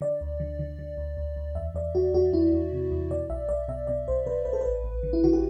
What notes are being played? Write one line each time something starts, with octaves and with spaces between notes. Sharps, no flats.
D3 D5
D2
D3
D3
D3
D2
D2
D2
E2 E5
E2 D5
E2 F#4
E2 F#4
E2 E4
E2
C3
E2
B2 D5
B1 E5
B1 D5
B2 E5
B2 D5
B1 C5
B2 B4
B1 B4
A4
A1 B4
A1
D3
E4
D3 F#4
G4